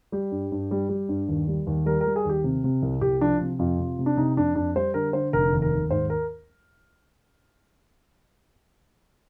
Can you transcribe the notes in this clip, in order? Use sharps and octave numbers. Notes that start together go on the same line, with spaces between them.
G3 G4
G2
G2
G3
G3
G2
D#2
G3
D#2
G3 A#4
A#4
G3
G#4
D#2 G4
C3
C3
C2
C2 G4
F3 D4
C3
F2 F4
C3
C3
D4
C3 D#4
F2 D4
F2 D4
G3 C5
D3 A#4
D3 C5
F1 A#4
D#2
A#4
D#2
G#2 C5
A#4